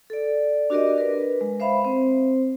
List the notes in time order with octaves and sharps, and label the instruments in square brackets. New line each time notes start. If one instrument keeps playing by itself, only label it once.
[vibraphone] A4 D5
D4 F#4 G4 A#4 D5 D#5
A#4 B4
G#3
C5 E5 F5 B5
C4 C5